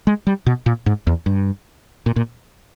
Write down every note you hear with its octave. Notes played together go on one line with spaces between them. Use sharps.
G#3
G3
B2
A#2
G#2
E2
G2
A#2
A#2